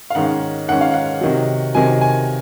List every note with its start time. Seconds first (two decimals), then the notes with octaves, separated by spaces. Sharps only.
0.10 F5
0.15 G#2 D#3 G#3 C#4 F#5
0.68 G#2 D#3 G#3 C#4 F#5
0.81 F5
0.94 F#5
1.21 C3 D#3 F#3
1.75 C3 D#3 F#3 G#5
2.01 G#5